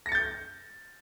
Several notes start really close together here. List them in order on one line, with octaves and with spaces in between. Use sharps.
A#6 C#7 A6 G6